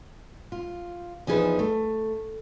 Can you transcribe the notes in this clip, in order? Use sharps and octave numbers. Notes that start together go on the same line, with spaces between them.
F4
E2 F3 D#4 G#4 B4 E5
A3